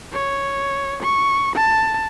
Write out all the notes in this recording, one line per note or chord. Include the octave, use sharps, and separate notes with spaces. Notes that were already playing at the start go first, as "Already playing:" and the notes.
C#5
C#6
A5